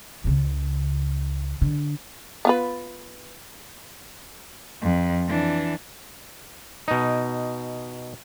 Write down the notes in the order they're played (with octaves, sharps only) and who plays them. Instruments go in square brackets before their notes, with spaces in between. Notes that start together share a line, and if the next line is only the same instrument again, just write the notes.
[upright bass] C#2 C#3
D3
[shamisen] B3 F4 B4
[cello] F2
E3 D4
[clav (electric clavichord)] B2 D#4